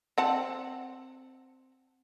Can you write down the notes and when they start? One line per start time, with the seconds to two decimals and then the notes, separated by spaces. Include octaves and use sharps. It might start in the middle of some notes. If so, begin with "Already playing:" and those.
0.18 C4 F#5 A5